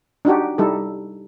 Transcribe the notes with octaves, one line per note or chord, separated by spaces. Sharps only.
D4 D#4 F#4 G4
G3 D#4 E4 A4